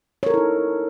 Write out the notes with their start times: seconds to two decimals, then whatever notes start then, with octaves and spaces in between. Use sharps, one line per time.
0.23 C#5
0.26 A#4
0.30 A4
0.34 E4
0.37 D#4